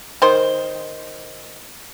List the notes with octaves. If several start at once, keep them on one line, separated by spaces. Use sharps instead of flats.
D#3 C5